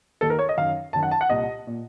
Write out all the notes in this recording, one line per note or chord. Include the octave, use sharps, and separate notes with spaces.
D#2 D#3 A4
A#4
C#5
D#5
F#2 D#3 F5
F#2 D#3 A5
F#5
A5
F#5
C2 A#2 D#5
A#2